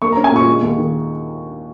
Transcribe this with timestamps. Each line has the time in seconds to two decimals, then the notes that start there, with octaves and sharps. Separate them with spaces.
0.02 A#3 C#6
0.12 A#5
0.17 C#4
0.24 G#5
0.32 A#2 C#6
0.47 G#3
0.62 D#2
0.77 D#3